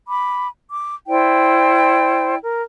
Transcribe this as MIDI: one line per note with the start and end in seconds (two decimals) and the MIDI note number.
0.08 0.47 83
0.08 0.47 86
0.71 0.96 86
1.08 2.37 64
1.08 2.37 72
1.08 2.37 74
1.08 2.37 79
2.42 2.63 70